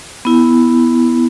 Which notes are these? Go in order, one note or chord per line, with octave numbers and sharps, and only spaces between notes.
B3 E4